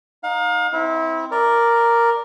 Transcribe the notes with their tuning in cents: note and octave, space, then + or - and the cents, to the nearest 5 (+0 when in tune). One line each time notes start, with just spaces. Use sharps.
D#4 +0 F5 +35
C4 +0 E4 -25
A#4 +0 D5 +0